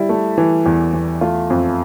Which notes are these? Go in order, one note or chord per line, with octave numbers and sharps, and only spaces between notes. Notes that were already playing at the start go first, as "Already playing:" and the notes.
Already playing: G3 E4
A3
E3
E2
E2
A3 F4
F2